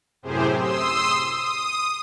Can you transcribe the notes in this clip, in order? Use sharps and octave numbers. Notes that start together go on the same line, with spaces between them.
F#2 A2 C3 G4 G#4 C5
C6 D#6 E6
D#6